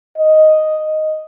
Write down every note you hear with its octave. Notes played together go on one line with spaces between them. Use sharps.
D#5